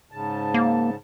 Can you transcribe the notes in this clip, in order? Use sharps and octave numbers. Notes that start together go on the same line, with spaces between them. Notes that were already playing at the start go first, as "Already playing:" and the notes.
G#2 C#3 A5
A#3